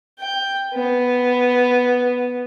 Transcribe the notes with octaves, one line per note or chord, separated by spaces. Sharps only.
G5
B3